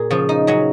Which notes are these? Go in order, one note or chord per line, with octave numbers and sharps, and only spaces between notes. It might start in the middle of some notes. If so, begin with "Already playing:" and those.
Already playing: A#2 G#4 A#4
C#3 F3
D#4
C#3 F#3 C#4